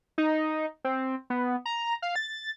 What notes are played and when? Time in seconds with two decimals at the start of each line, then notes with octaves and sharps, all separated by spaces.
0.18 D#4
0.84 C4
1.30 B3
1.66 A#5
2.02 F5
2.15 A6